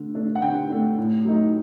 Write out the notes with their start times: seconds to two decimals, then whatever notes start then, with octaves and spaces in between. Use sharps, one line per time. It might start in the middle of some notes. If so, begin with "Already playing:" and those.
Already playing: D3 A3 D4
0.14 A3 D4
0.35 F#5
0.42 D3 G5
0.70 A3 D4
0.98 A2
1.25 F#3 A3 D#4